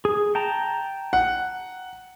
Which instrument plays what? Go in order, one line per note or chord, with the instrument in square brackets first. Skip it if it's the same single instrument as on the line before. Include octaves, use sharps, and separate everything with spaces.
[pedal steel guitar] G#4
G5 A5 A#5
[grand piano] F#5